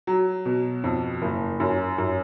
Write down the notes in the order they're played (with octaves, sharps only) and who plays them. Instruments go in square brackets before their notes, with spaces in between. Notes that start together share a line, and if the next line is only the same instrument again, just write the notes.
[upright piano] F#3
B2
F2
F#1
F#2
F#2